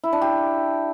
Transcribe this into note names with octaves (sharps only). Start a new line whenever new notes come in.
E4
D4
G4